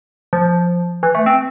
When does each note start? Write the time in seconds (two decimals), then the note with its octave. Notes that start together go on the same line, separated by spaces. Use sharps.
0.33 F3
1.03 E3
1.15 A3
1.26 C4